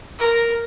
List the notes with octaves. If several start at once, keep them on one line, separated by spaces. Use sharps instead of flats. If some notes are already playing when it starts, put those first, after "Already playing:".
A#4